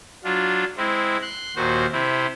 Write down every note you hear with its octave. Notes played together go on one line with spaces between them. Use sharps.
F#3 D4 F4
G#3 C4 E4
C6 F#6
D#2 A#2 F#4 C5
C3 C4 E4